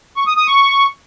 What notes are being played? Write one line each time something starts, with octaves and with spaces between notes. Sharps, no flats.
C#6
D#6
D#6
C#6